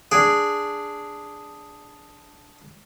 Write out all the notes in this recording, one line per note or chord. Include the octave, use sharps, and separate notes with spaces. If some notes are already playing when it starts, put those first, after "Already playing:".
D4 G#4